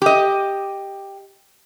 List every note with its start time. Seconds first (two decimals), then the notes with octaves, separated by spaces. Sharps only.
0.02 G4 D#5